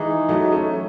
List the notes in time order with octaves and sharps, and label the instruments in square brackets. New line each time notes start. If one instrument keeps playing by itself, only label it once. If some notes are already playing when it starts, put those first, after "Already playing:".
Already playing: [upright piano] E3 G#3 [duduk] D#4
[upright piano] F#3 A3
A3 C#4